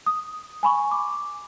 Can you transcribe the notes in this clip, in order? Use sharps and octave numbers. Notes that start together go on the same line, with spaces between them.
D#6
G#5 B5 C#6
D6